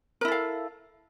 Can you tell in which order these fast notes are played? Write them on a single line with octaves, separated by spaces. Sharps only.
A#4 E4 A4 F5